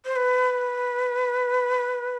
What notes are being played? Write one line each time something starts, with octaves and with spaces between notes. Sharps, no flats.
C5
B4